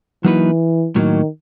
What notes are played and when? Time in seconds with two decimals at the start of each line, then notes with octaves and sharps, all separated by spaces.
0.25 E3 F#3 A#3 D#4 F#4 B4
0.96 A2 D#3 F#3 A#3